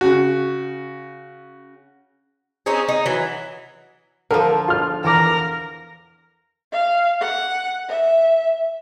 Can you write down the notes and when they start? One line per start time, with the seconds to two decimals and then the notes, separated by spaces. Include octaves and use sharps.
0.01 C#3 F#4
2.66 C4 C#4 D#4 G#4
2.88 D#4
3.06 E3 F#3
4.31 D3 F3 A#4
4.68 F4 F6
5.04 E2 A#4 D6
6.72 F5
7.21 F#5
7.88 E5